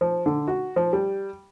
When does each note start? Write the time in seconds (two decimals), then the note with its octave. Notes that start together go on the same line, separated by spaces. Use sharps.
0.01 F3
0.26 D3
0.48 F#4
0.76 F3
0.93 G3